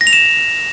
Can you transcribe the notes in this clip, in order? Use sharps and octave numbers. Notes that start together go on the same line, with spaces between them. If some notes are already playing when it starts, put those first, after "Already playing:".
A#6
F7
E7